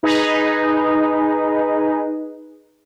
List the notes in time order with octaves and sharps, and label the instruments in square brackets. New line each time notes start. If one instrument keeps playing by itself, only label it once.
[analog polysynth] D#4 G#4 B4